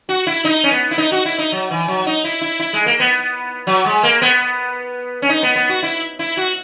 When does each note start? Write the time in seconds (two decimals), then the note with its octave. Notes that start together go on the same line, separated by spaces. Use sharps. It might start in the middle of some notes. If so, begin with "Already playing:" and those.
0.09 F#4
0.27 E4
0.45 D#4
0.64 C#4
0.71 B3
0.91 E4
0.98 D#4
1.12 F#4
1.25 E4
1.38 D#4
1.52 F#3
1.71 E3
1.88 F#3
2.06 D#4
2.24 E4
2.41 E4
2.60 E4
2.73 G#3
2.86 A#3
3.00 B3
3.67 F#3
3.86 G#3
4.03 A#3
4.22 B3
5.22 C#4
5.29 D#4
5.43 B3
5.56 B3
5.69 F#4
5.83 E4
6.19 E4
6.37 F#4